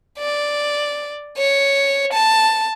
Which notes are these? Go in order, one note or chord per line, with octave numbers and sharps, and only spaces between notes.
D5
C#5
A5